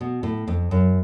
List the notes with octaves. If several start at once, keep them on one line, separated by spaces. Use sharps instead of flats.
B2
A2
F2
F#2